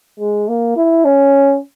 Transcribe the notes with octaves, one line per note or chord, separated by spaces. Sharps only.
G#3
A#3
E4
C#4